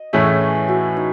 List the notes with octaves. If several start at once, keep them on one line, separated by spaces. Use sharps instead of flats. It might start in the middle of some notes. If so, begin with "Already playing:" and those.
Already playing: D#5
A2 E3 A3 C#4 E4 G#4
F#4
D#4